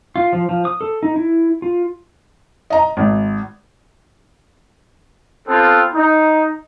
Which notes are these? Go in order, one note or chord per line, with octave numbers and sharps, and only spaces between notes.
F4
F3
F3
D#6
A4
D#4
E4
F4
D#5 A#5
G#1
B3 C4 F4 A4
D#4